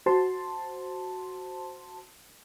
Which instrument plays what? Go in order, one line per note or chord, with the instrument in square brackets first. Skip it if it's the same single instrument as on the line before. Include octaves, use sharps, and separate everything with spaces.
[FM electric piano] F#4 C5 A5 C6